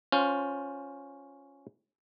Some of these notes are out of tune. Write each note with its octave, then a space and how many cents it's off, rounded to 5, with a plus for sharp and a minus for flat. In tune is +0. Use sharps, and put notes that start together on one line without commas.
C#4 +0 F4 +15 C5 +0